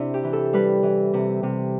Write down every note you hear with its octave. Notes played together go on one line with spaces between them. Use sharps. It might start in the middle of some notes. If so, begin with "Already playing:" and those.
Already playing: C3 D4 E4
G4
E3
A4
G3 B4
E3
C3
C3